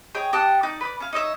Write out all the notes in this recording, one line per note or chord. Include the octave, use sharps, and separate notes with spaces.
G#4 C#5 D#5 G5
G4 D#5 F#5 A5
D#4 D5
B4 D5
C#4 F5
D#4 C#5 D#5 E5